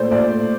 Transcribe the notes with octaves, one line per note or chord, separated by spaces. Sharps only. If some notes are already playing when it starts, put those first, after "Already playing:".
Already playing: A#2 A3 C5 D5
A#2 D5
A3